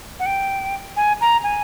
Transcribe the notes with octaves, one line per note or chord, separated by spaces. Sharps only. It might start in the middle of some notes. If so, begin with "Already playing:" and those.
F#5
G5
G#5
A#5
G#5